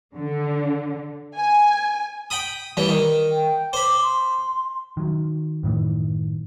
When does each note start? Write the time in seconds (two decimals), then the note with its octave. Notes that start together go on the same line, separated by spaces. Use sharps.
0.16 D3
1.38 G#5
2.30 G5 B5 D#6
2.77 E3 G3
2.89 D#3
3.30 G5
3.73 C5 B5 D6
4.02 C6
4.97 D#3 F#3
5.63 F#2 A2 D#3 E3